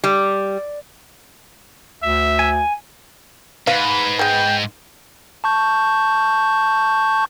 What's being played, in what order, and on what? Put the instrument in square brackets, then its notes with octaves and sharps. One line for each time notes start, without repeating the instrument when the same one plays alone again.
[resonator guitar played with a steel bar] G3
[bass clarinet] D2 [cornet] E5
[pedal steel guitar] G#5
[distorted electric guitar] G#2 [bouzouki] B4 [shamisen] F5
[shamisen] G#3 B3 [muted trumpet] G5
[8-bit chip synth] A5 C#6 G6